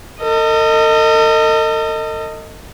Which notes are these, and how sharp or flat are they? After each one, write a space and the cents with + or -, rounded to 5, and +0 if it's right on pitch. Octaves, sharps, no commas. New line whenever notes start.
A4 +45 D#5 +0